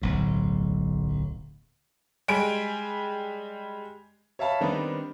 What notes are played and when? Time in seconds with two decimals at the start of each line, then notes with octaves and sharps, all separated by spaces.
0.02 D1 B1 A2
2.28 G3 G#3 G#5 D7
4.39 C#5 E5 F5 A5 B5
4.61 D#3 G3 B3 C4 D4 D#4